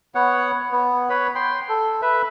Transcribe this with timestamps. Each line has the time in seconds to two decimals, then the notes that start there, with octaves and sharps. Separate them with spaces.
0.15 B3 C#5 F#5
0.72 B3
1.10 B4 C#5 B5
1.35 G5 C6
1.69 A4
2.02 B4 E5